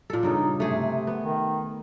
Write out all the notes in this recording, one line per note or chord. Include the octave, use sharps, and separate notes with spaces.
A#2 A4
G2 C#3 D#4 A4
C3 A3 G#4
B3
D#3